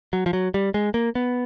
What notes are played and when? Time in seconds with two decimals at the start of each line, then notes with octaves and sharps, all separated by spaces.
0.13 F#3
0.26 F3
0.33 F#3
0.54 G3
0.74 G#3
0.94 A#3
1.15 B3